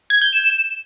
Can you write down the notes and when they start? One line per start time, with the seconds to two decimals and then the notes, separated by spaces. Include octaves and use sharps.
0.10 G#6
0.21 G6
0.33 E7